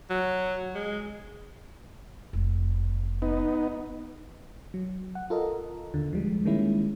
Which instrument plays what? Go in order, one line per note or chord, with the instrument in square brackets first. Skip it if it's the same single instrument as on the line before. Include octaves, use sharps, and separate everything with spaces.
[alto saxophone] F#3
G#3
[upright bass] F1
[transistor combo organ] B3 D#4
[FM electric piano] F#3
F#5
F4 A4 A#4 D#5
D#2 D3
F3 G3 G#3
D#3 G3 G#3 A#3 C#4 E4